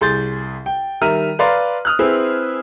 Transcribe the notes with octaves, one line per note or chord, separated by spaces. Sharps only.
C2 G#4 C6 G6 A6
G5
D#3 G3 E5 A#5 F6 D#7
B4 D5 F5 A#5 C6
D#6 F6 F#6
C4 E4 G#4 B4